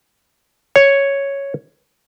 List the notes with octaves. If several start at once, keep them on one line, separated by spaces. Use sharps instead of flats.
C#5